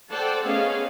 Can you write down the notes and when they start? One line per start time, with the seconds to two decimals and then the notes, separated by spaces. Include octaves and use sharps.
0.11 A4 C5 D5 F#5 G5 A5
0.45 A3 B3 C#4 G#4 D#5 F5